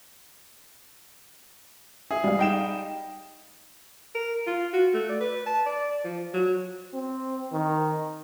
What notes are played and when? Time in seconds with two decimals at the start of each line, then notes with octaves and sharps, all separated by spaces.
2.11 G#4 E5
2.24 G3 F5
2.39 D#4 G5 E7
4.15 A#4
4.47 F4
4.73 F#4
4.94 A3
5.09 D5
5.20 B4
5.46 A5
5.66 D5
6.04 F3
6.34 F#3
6.94 C4
7.52 D#3